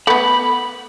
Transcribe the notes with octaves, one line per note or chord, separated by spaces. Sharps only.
A3 B3 B5